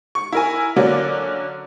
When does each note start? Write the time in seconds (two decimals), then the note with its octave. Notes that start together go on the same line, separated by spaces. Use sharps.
0.15 C#6
0.32 E4 A#4 G#5
0.76 D3 F#3 A#3 C#4 D5